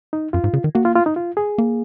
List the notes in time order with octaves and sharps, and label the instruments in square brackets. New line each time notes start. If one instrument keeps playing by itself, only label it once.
[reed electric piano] D#4
[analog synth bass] F#2 [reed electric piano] F4
[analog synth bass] G#2
C#3
D#3
[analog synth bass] A#3 [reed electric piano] F#4
[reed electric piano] F4
F4
D#4
F4
G#4
[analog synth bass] A#3